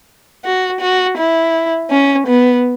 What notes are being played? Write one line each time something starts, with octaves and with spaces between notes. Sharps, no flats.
F#4
F#4
E4
C#4
B3